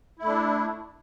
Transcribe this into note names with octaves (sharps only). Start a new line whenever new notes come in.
A3 D4 E4